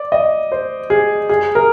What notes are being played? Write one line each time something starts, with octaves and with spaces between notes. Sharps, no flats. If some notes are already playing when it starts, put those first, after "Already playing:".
Already playing: D5
D#5
C5
G#4
G#4
A#4